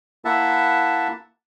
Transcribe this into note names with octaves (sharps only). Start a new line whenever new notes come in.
A#3 E4 E5 F#5 A5